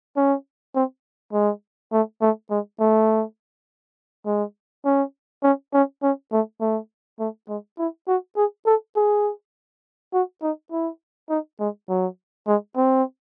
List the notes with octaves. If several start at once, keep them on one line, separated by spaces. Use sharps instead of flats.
C#4
C4
G#3
A3
A3
G#3
A3
G#3
C#4
C#4
C#4
C#4
A3
A3
A3
G#3
E4
F#4
G#4
A4
G#4
F#4
D#4
E4
D#4
G#3
F#3
G#3
C4